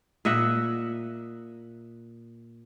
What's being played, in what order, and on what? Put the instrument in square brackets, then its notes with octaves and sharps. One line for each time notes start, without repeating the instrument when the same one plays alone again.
[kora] A#2 D#5 E5 F#5